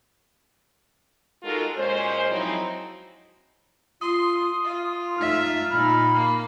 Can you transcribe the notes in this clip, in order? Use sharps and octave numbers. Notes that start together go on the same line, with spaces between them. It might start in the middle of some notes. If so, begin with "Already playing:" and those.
G#3 D#4 F4 F#4 A4 A#4
A#2 G#3 C#4 C5
F3 F#3 G#3 C4 D#4 E4
F4 C6 D#6
F4 C6
A3 D#4 E5 F6
A#2 D#4 B5 F6
A#3 C7